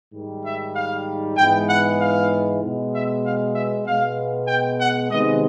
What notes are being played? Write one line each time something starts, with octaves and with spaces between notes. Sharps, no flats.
G#2 D#3 G3
E5
F5
G#2 E3 G#3 B3 G5
F#5
F5
B2 G#3 B3
E5
F5
E5
B2 G#3 B3 F5
G5
F#5
C3 D#3 G#3 B3 D#5